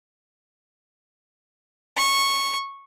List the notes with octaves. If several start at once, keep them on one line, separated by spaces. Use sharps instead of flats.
C#6